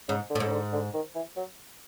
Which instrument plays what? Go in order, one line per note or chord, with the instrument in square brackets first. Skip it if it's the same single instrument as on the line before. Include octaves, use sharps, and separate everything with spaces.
[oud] G#2 [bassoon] C#3
[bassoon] D3
[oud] A2
G#2
[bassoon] C#3
D3
D3
D#3
E3
F#3